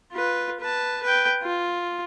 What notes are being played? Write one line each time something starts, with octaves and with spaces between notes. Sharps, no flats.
F4 B4
B4 A5
B4 G5
F4